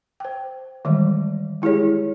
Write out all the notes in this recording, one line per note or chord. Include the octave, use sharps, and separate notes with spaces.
C5 G5
D#3 E3 G3 G#3
G#3 E4 G4 G#4 C#5